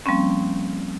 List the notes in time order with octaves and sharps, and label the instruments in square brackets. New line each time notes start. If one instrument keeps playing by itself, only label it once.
[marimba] F3 G3 A#3 C4 C#4